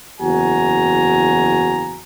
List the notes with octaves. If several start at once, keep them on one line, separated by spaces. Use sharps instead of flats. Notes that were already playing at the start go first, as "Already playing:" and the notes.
F#1 E2 F#4 G#5 A#5